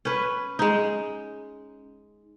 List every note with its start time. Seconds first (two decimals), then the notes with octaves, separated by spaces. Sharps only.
0.05 C#4 B4
0.59 G#3 D#4